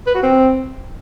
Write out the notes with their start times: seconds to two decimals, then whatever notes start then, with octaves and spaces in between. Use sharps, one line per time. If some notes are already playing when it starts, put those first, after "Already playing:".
0.07 B4
0.15 F#4
0.23 C4